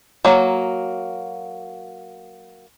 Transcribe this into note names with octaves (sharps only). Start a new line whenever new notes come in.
F#3 A#3